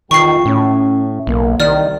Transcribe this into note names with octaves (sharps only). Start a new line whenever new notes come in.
E2 D#3 F4 G5 C#6 C7
A2 C#4
B1 A#3
C2 D#3 D5 F6